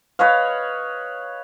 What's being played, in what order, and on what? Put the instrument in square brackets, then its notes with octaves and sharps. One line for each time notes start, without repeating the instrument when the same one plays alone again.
[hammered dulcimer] B4 C#5 D#5 F5